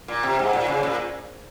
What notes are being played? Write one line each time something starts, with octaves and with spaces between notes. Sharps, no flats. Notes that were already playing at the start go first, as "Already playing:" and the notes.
A#2
C3
G#2
A#2
C#3
A#2